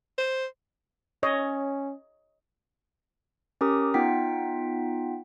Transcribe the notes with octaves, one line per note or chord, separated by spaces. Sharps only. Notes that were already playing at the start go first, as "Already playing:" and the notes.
C5
C#4 C#5 D#5
C#4 G4 A#4 A#5 D6 D#6
B3 D#4 F4 F#5 G5 B6